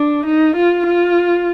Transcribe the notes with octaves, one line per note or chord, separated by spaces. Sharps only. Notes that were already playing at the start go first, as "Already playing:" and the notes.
Already playing: D4
D#4
F4
F4